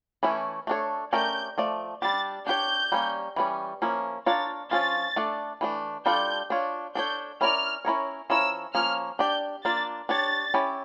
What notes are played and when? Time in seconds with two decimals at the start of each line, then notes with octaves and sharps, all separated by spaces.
0.23 E3 A3 C#4 E4
0.67 A3 D4 A4 C#5
1.13 A3 C#4 G4 A#4 D5 G6
1.58 F3 A3 D5
2.02 G3 D4 G4 A6
2.47 D4 G4 C#5 G6
2.92 G3 A#3 C#4
3.36 E3 G3 C#4
3.82 F3 A#3 C#4 E4
4.26 D4 F4 A#4 C#5 A6
4.71 F3 C#4 F4 A6
5.16 A3 D4 A4 D5
5.61 E3 A3 D4
6.05 G3 D4 F4 A4 D5 G6
6.50 D4 F4 C#5
6.95 D4 A4 C#5 G6
7.41 C#4 E4 A#4 D5 F6
7.85 C#4 E4 A#4 C#5
8.30 F3 C#4 E4 A#4 C#5 E6
8.74 F3 A#3 C#4 F6
9.19 D4 G4 D5 G6
9.65 A#3 D4 F4 A6
10.09 D4 G4 C#5 A6
10.54 C#4 E4 G4